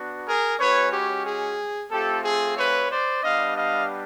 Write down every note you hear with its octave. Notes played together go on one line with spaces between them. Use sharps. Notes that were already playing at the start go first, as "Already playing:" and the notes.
Already playing: B3 D4 F#4
G#4 A#4
G#3 C#4 F#4 B4 C#5
G4
G#4
A3 C4 F4 G4 A4
G#4
B4 C#5
C5 D5
G3 B3 D4 G4 D#5 F5
D#5 F5